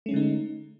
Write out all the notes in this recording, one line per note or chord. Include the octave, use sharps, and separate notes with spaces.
D3 G#3 A3 C#4 D#4